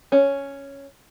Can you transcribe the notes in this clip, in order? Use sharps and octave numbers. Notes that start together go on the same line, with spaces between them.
C#4